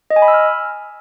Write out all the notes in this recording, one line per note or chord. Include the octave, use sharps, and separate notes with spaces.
D#5
G#5
B5
E6
F6